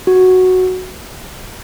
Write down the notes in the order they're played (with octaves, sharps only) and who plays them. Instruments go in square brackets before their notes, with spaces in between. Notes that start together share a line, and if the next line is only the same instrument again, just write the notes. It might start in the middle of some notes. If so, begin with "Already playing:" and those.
[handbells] F#4